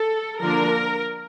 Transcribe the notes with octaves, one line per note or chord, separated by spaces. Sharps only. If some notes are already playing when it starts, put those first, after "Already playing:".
Already playing: A4
D3 F3 A#3 D4 A#4